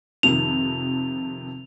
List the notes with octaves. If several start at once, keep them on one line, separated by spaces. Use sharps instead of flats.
F2 C3 D#3 F7